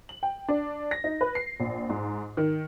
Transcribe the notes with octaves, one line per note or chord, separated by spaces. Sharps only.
F#7
G5
D4
A#6
D#4
B4
C7
A#1
G#2
D#3